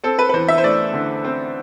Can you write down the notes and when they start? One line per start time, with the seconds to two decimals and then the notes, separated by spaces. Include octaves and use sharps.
0.04 C4 A4
0.19 B4
0.29 B4
0.33 E2 C5
0.48 E5
0.58 C5
0.64 A3 D5
0.94 D3
1.24 C4